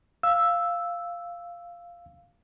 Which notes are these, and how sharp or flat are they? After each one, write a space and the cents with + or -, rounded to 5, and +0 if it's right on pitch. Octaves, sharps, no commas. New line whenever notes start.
F5 -5 E6 +0